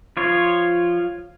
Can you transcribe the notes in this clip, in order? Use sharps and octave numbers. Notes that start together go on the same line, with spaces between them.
F3 F4 C#5